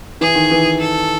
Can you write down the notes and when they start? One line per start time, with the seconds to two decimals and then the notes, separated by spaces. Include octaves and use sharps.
0.21 E3 G#4
0.35 D#3
0.51 E3
0.80 A4